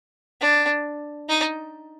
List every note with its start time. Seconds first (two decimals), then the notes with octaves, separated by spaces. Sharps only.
0.41 D4
1.29 D#4